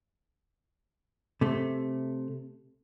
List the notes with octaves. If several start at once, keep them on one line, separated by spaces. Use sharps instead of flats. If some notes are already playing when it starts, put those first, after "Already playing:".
C3 A3